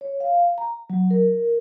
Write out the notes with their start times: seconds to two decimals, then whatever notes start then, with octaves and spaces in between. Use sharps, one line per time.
0.01 C#5
0.20 F5
0.58 A#5
0.90 F#3
1.11 A#4